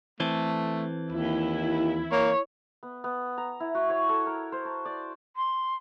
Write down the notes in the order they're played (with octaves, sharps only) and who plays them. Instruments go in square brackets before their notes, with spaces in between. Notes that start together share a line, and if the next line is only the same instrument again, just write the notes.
[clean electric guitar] E3 C4 A4 [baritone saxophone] A3
[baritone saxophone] D#2 [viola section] E4
[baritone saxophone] A#3 [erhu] C#5
[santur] B3
B3
A#5
E4
F#4
C#5
A4
A#4
C5
A5
D5
[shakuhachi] C6